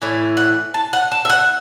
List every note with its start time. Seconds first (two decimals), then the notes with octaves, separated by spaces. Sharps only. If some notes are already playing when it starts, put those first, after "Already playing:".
0.02 A2 E3
0.37 F#5
0.74 A5
0.93 F#5
1.11 A5
1.25 E5
1.29 F#5